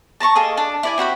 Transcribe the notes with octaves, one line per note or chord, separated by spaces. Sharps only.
A5 A#5 C6 C#6
A#3 G#4 A4 D#5
D4
E4 D5 G#5
C4 F#4 C5 B5